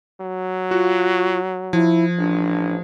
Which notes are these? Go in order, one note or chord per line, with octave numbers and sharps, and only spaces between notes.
F#3
F4 F#4
F3 E4
A1 D4